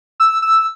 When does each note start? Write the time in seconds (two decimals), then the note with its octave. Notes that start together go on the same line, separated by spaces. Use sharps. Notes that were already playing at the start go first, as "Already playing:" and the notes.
0.20 E6
0.42 E6